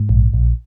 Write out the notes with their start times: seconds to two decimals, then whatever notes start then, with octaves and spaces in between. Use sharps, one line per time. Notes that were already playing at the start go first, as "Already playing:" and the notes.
Already playing: G#2
0.09 A#1
0.34 A#1